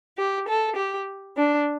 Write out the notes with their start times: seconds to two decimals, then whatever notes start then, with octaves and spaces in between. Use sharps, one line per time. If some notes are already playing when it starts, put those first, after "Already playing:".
0.17 G4
0.48 A4
0.76 G4
1.36 D4